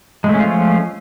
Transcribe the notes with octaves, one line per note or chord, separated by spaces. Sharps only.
F3 G#3 A3 C#4 F4